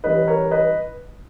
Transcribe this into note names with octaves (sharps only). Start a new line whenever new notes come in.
E3 G3 C#4 B4 D#5
A#4 C#5
B4 D#5